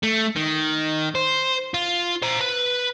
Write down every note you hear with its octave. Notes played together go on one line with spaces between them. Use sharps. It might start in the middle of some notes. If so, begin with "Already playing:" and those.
A3
D#3
C5
F4
C5 A#5
B4